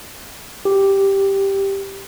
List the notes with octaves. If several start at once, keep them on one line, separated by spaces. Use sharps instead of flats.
G4